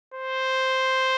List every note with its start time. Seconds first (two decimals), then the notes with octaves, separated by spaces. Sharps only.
0.14 C5